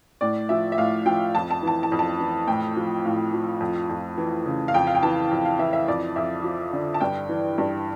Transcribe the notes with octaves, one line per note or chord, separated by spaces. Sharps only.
A2 D5
F3 E5
E5
A2 F5
F3 G5
F2 A5
A5
E3 A5
A5
F2
A5
E3
A2 G5
F3
A2 F5
F3
F2
F2
E3
C#3
F5
F2 G5
F5
G5
E3 A5
F2
F5
E3 E5
E5
F2 D5
F2 E5
F3
D3
A5
G2 G5
E3
G2